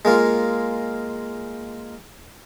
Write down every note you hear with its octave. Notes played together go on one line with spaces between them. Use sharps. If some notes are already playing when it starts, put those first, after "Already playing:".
G#3 A#3 F4